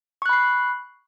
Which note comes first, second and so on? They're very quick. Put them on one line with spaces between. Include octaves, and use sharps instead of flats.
C#6 F#6 B5 C7